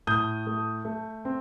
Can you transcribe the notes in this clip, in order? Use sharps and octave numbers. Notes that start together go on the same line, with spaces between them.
A2 D#6 G6
A3
A3
C4